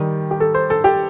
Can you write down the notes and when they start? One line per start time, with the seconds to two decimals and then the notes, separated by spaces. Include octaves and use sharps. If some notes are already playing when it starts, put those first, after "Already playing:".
Already playing: D#3 G3 G4
0.31 G4
0.40 A4
0.55 C5
0.70 A4
0.84 G4